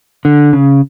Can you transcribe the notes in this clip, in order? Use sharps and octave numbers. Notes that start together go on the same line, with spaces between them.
D3
C#3